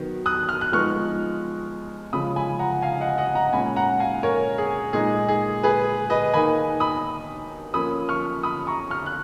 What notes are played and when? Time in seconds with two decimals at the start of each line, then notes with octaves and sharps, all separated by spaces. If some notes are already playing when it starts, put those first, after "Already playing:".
Already playing: D#3 F#3 B3
0.26 D#6 F#6
0.49 F6
0.61 F#6
0.72 F3 G#3 B3 D#4 C#6 F6
2.13 C#3 F3 G#3 C#4 B5 D#6
2.36 G#5 B5
2.59 F#5 A#5
2.82 F5 G#5
3.00 D#5 F#5
3.18 D#5 F#5
3.35 F#5 A#5
3.53 A#2 G#3 C#4 G#5 B5
3.76 F#5 A#5
4.00 F5 G#5
4.23 A#4 C#5
4.58 G#4
4.93 A#2 G#3 D#4 G#4
5.28 G#4
5.63 G#4 B4
6.10 B4 D#5
6.34 D#3 A#3 D#4 G#5 B5
6.80 B5 D#6
7.74 F3 A#3 C#4 B5 D#6
8.09 C#6 F6
8.43 B5 D#6
8.67 A#5 C#6
8.91 C#6 F6
9.06 F#6